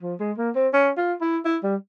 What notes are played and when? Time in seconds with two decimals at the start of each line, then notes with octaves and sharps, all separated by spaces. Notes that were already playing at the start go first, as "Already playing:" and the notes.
0.02 F3
0.20 G#3
0.38 A#3
0.55 C4
0.74 C#4
0.97 F4
1.21 E4
1.45 E4
1.63 G3